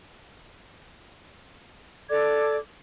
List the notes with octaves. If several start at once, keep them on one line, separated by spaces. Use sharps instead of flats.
A4 D5 D6 G#6